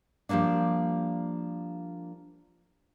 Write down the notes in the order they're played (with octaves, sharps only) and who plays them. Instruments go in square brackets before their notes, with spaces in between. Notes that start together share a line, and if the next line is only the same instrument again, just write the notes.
[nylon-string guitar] F3 G3 G#3 A#3 D4